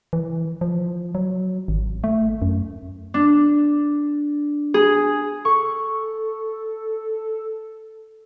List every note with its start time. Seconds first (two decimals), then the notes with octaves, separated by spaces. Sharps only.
0.13 E3
0.61 F3
1.15 F#3
1.68 G#1
2.04 A3
2.42 F#2
3.14 D4
4.74 G#4
5.45 A4 C#6